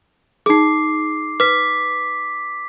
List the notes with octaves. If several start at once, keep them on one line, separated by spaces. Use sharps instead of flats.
D#4 G#4 D6 C7
B4 D6 B6